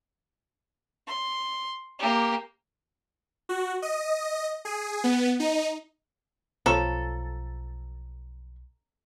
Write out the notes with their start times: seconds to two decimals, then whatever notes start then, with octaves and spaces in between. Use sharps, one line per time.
1.07 C6
1.99 A#3 G4
3.49 F#4
3.82 D#5
4.65 G#4
5.04 B3
5.40 D#4
6.66 B1 F3 A4 C#5 A#5